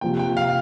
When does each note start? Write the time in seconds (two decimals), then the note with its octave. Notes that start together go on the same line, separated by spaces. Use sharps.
0.01 C3 F3 A#3 G5
0.19 G5
0.37 F5